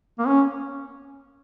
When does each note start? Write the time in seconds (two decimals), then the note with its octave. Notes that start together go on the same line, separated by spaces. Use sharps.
0.19 A#3
0.27 C#4